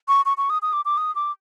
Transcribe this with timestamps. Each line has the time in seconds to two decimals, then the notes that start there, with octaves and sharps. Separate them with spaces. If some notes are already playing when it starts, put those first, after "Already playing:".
0.08 C#6
0.26 C#6
0.37 C#6
0.50 D#6
0.62 D#6
0.73 D6
0.85 D6
0.98 D#6
1.15 D6